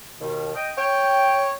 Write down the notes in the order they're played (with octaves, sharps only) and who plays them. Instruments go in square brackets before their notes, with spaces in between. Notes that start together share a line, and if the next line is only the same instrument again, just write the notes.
[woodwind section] D#2 B2 D#3
D#5 G5
[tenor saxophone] C#5 [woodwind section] G5